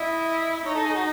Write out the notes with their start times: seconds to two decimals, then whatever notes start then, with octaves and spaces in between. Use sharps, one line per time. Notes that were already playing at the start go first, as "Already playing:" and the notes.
Already playing: E4 D#5
0.65 D#4 C#5
0.75 A4
0.85 G#4
0.94 F#4